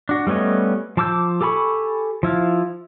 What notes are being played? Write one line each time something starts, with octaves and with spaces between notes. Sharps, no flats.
D4 F#4
G3 A3 B3 C#4 D#5
F3 A5 D6 E6 G6
G4 A4 G#5 B5 C#6
F3 E4 F4